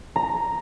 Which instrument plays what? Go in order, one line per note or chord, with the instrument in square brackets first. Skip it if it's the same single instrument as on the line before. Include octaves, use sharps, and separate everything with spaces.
[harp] A#5